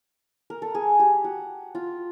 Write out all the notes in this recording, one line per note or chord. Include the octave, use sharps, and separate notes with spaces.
A#4
A4
G#4
G4
F#4
F4